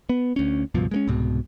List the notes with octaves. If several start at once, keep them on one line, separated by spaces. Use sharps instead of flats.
B3
D2 C#4
C#2 G2 B2 F3
G#3 A#3 C#4
C2 G#2 B2